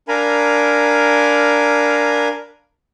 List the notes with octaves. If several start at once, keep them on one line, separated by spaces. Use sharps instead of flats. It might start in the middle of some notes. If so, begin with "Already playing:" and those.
D4 A#4 F5 G#5 A#5 B5